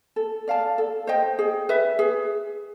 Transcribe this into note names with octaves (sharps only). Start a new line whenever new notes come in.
A4
D5 F5 A5
A4
C5 D#5 G5
G#4
B4 E5
G#4